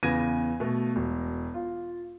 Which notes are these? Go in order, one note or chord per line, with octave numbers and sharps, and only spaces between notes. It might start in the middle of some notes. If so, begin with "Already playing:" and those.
E2 C#3 B3 G#6 A#6 D#7
B2 A3
E1
F4